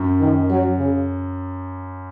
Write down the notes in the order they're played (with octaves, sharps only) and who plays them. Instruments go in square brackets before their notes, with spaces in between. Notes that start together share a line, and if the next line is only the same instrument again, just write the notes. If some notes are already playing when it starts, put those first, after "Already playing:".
Already playing: [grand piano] F#2
[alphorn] D#3
F#3
C#3